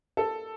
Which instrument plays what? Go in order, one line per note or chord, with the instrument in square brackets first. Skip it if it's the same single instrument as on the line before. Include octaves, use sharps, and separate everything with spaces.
[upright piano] A4